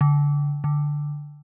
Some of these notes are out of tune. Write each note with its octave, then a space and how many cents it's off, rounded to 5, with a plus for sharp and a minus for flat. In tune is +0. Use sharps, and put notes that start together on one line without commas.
D3 -25
D3 +0